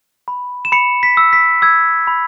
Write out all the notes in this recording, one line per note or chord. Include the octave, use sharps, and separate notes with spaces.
B5
E7
B5 C#7
B6
E6
B6
E6 G#6
B5